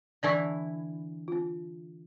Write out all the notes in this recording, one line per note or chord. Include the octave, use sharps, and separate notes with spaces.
D3 E3 E4 D5 C#6
C4 F4